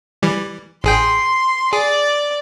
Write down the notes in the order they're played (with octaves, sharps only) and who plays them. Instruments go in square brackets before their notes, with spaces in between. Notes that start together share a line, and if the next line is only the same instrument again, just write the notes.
[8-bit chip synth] E3 G3
[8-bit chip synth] A1 G#4 G5 [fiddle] C6
[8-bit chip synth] G#4 [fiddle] D5